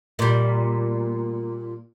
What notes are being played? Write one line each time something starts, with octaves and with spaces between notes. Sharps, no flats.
A#2 G3